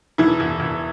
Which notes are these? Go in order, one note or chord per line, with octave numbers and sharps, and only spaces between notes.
E1 E3 E4
E1
E1